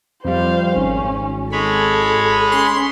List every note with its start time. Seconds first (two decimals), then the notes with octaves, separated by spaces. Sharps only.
0.25 F2 G3 C5 F5
0.76 G#1 C#4
1.52 G#3 A4 C#5 B5
2.52 C#4 C6